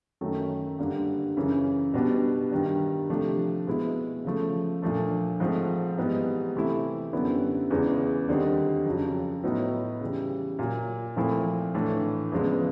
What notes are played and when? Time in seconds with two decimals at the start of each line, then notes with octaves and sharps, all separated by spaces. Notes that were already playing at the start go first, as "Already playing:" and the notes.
0.21 F#2 D#3 F#3 A3
0.79 G2 D3 G3 A#3
1.37 F#2 C#3 E3
1.94 B2 G3 B3 D4
2.52 G2 D#3 G3
3.09 C3 F3 A3 D4
3.67 B2 G#3 B3 E4
4.24 C#3 F3 A3
4.82 A#2 F3 A3 D4
5.40 G#2 F3 A3 C4
5.97 G#2 E3 G3 B3 D#4
6.55 C3 E3 A3 C4 E4
7.13 F#2 D3 G3 B3 E4
7.70 E2 C#3 E3 G#3 B3
8.28 D#2 D3 G3 C4 D#4
8.85 F2 C#3 F#3
9.43 A2 F#3 B3 D#4
10.01 C#3 E3 G3
10.59 A#2 F#3 A#3
11.16 A#2 F3 A3 C4 E4
11.74 A2 E3 A3 D4
12.32 E2 C#3 F3 G#3 B3